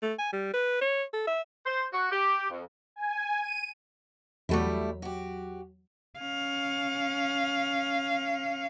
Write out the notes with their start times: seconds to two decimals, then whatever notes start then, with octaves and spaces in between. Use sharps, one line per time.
0.03 A3
0.19 G#5
0.33 G3
0.54 B4
0.81 C#5
1.13 A4
1.27 E5
1.66 C5
1.92 F#4
2.11 G4
2.49 F2
2.96 G#5
3.41 D#7
4.49 E2 F#3 G3 A3 E4
5.02 F#4 G4
6.19 C#4 F5